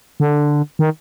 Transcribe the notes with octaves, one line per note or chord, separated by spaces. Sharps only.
D3
D#3